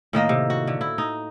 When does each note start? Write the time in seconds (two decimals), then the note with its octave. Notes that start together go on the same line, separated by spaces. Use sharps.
0.13 A2 D#3 A#3 D#5
0.29 C3
0.50 F#4
0.67 D3
0.81 E4
0.98 D#4